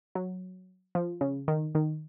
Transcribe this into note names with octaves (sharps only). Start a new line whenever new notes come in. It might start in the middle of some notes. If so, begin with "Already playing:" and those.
F#3
F3
C#3
D#3
D#3